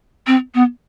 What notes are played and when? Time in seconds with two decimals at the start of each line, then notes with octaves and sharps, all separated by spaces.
0.27 C4
0.54 B3